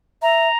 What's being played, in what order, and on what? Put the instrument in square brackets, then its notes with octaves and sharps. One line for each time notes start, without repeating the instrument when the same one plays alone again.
[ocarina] E5 [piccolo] A#5